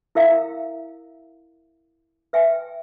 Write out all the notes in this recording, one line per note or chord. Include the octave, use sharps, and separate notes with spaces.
E4 A#4 E5 F5 A#5
B4 E5 G5 G#5